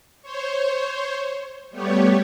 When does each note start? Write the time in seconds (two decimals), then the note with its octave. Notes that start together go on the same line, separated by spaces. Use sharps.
0.22 C5 C#5
1.71 G3 A3 B3 G4 C#5